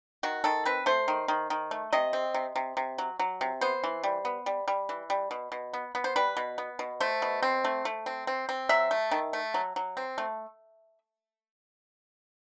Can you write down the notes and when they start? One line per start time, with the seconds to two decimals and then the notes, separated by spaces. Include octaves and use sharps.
0.23 D#3 F#4
0.44 D#3 A4
0.65 C4 B4
0.86 A3 C5
1.08 D#3
1.28 D#3
1.50 D#3
1.71 A3
1.93 C3 D#5
2.13 C4
2.34 C3
2.56 C3
2.77 C3
2.98 F#3
3.20 F#3
3.41 C3
3.61 B3 C5
3.84 E3
4.04 G3
4.25 B3
4.46 G3
4.68 G3
4.89 E3
5.10 G3
5.31 B2
5.52 B2
5.73 B3
5.95 B3
6.04 C5
6.16 G3 B4
6.37 B2
6.58 B3
6.79 B2
7.00 A3 C5
7.22 B2
7.43 C4
7.65 A3
7.85 A3
8.06 C4
8.27 C4
8.49 C4
8.69 F#3 E5
8.91 A3
9.11 D#3
9.33 A3
9.54 F#3
9.76 F#3
9.97 C4
10.18 A3